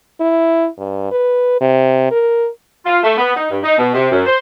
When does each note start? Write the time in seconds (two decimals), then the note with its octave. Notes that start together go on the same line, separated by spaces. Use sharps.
0.20 E4
0.78 G2
1.11 B4
1.61 C3
2.11 A#4
2.86 F4
3.03 A3
3.18 B3
3.37 D#4
3.50 G2
3.64 D#4
3.78 B2
3.94 C3
4.11 F#2
4.26 C5